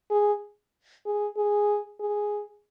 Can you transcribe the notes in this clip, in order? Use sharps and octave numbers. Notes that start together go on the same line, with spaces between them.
G#4
G#4
G#4
G#4